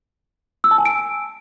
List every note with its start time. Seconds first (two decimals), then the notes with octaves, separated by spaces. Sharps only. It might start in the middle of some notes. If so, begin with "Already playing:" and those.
0.64 E6
0.71 A5
0.78 G#5
0.85 D7